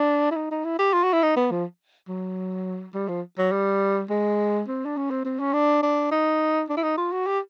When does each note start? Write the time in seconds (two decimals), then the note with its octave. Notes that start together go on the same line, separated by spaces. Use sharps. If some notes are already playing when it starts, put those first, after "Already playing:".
Already playing: D4
0.31 E4
0.36 D#4
0.51 D#4
0.65 E4
0.79 G4
0.93 F4
1.03 F#4
1.13 E4
1.23 D#4
1.36 B3
1.51 F3
2.08 F#3
2.94 G3
3.09 F3
3.38 F#3
3.52 G3
4.10 G#3
4.68 C4
4.85 D4
4.97 C#4
5.10 C4
5.25 C4
5.40 C#4
5.53 D4
5.83 D4
6.11 D#4
6.69 D4
6.77 E4
6.83 D#4
6.97 F4
7.12 F#4
7.26 G4